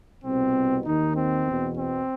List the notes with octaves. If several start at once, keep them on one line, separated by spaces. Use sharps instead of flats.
C2 B2 C4
D#2 D#3 D#4
C4
E2 B2
C4